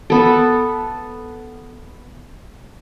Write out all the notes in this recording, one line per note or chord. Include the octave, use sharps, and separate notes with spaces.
B3 A4